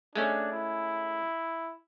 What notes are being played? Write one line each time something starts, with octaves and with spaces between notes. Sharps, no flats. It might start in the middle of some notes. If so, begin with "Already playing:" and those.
G#3 A3 C#4 D4
E4